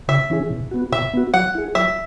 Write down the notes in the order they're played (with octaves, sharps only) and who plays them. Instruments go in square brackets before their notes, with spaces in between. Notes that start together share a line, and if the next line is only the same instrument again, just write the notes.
[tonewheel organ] C#3 [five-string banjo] E5
[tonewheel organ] E3 C#4 E4 G#4
B2
B3 F#4
[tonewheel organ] B2 [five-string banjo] E5
[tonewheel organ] B3 F#4
[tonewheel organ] F#3 [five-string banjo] F#5
[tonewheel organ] E4 G#4
[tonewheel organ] F#3 [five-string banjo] E5